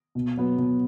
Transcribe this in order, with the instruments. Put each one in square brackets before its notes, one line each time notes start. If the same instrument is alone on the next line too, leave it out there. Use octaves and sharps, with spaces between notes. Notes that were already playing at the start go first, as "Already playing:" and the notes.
[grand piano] B2
F#3 B3
B2